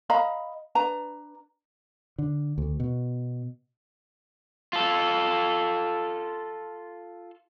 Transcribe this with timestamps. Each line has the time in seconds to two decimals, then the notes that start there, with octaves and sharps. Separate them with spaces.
0.10 D#5 F5 A#5 B5
0.75 D4 B4 A#5
2.18 D3
2.58 D2
2.80 B2
4.73 F4 A4